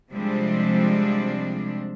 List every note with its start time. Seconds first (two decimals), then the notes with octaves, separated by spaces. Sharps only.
0.12 C3 F3 G3 G#3 C4 D4